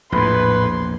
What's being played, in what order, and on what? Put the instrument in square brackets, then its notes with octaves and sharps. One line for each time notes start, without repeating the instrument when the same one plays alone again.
[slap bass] A#1 E2 [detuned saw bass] A2 [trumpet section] B4 [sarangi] C6